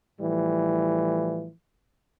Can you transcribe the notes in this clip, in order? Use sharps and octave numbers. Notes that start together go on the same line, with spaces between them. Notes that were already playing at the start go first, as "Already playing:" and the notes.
A2 E3 F3 G3